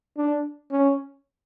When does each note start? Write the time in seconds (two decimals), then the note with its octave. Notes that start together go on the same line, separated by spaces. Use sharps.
0.17 D4
0.71 C#4